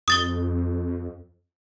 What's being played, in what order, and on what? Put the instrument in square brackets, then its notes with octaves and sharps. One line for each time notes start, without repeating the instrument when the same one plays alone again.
[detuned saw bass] F2 [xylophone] D#6 A6 G7